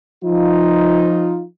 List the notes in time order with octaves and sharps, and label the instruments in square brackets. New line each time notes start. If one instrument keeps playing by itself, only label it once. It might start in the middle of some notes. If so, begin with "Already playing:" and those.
[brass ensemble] F3 D#4 F4